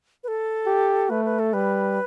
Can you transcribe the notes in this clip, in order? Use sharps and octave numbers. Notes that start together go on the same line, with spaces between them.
B4
A4
G4
A3 B4
B4
A4
G3 B4